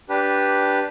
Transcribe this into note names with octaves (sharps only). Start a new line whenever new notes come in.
D4 G4 B4